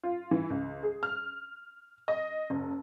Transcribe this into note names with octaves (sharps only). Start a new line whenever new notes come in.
F4
E3
C#2
G#4
F6
D#5
F#1